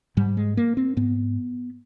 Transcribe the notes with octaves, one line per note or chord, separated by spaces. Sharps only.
G#2 G3
G#3
A#3
C4
G#2 B3